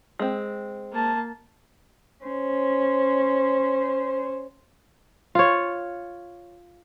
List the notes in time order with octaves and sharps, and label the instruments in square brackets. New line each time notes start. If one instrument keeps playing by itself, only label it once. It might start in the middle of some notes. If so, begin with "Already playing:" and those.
[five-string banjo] G#3 C4
[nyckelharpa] A#3 A5
[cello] C#4 C5
[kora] F4 C#5